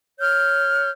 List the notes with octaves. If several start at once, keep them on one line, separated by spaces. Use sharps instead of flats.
C#5 F6 G6